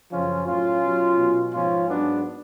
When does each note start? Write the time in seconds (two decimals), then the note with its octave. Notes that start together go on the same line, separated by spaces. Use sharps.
0.11 F#2 C#3 F3 C#4 F4
0.47 A2 F#3 C#4 F4
0.82 B2 F#3
1.18 B2 F#3
1.52 G#2 F3 C#4 F4
1.88 G#2 F#3 B3 D4